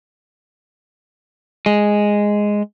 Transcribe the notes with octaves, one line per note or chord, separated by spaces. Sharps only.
G#3